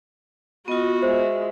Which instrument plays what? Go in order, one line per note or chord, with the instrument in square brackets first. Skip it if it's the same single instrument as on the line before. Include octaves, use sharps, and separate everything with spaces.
[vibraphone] B3 F4 [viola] F#4 [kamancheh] D#5
[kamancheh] G#3 E5 [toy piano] C5